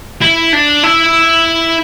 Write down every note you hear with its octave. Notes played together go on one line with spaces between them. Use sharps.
E4
D4
E4